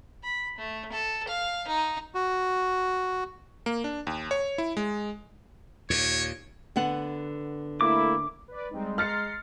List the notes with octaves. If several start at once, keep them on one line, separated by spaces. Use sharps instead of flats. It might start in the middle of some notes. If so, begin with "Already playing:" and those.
B5
A3
A4
F5
D#4
F#4
A#3
D4
D#2
C#5
E4
G#3
D#2 A#2 C#5
D3 B3 F#5
A3 A#3 E4 D6
B4 D5
G3 G#3 C4 D#4
A#5 C6 F6 A6 C7 C#7